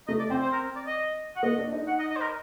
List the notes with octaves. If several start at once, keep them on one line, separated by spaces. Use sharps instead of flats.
A3 D#5
D5
C4 C5
C5
A#4
D5
D#5
F#5
A#3 D#5
D4
D#4
F#5
D#5
D#5
C5
A#4